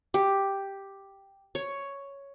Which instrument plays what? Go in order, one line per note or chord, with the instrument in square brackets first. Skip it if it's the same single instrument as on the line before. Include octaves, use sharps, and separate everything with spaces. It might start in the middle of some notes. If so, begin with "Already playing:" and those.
[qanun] G4
C#5